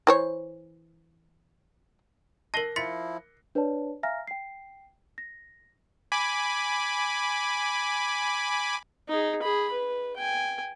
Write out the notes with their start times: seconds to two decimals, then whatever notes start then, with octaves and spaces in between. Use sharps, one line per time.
0.07 E3 C5 C#5
2.54 A#4 A5 A#6 C7 G7
2.76 F3 E4 C6 A6 B6 C#7
3.55 D4 B4 C#5 D5 A5
4.03 E5 F5 G#5 A#5 F6 A#6
4.27 G5 C7
5.18 A#6
6.12 G#5 B5 D6
9.09 D#4 G#4
9.42 G#4 B5
9.72 B4
10.16 G5 G#5